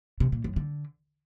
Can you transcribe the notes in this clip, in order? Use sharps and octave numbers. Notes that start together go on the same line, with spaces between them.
C3
A#2
F#2
D3